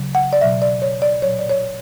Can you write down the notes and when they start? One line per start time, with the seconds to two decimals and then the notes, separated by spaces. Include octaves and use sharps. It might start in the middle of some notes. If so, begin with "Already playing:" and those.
Already playing: C#3 F#3
0.15 F#5
0.33 D5
0.41 B2 F#3 E5
0.62 D5
0.82 C#5
1.02 D5
1.22 A#2 F#3 C#5
1.39 D5
1.49 C#5